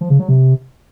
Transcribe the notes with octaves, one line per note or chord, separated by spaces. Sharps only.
F3
C#3
F#3
C3